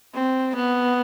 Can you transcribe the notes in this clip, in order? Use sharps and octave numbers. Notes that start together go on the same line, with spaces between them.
C4
B3